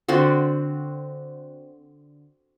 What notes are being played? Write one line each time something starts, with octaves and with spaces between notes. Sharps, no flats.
D3 C4 F#4